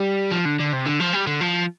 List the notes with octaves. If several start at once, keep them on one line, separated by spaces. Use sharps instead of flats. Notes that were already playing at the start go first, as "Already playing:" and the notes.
Already playing: G3
F3
D3
D3
C3
D3
F3
G3
D3
F3